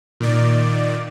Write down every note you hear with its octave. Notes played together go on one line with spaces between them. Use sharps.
A#2 D#3 D5